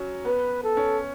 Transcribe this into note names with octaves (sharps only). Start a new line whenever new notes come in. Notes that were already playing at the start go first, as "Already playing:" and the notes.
Already playing: F#3 C#4
B3 B4
A4
C#4